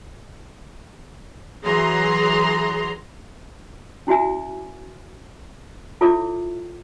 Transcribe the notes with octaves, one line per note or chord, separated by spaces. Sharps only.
E3 F#3 G#4 A#5 C6
C#4 E4 F#4 E5 G#5
E4 F4 A4 C#5 E5 D6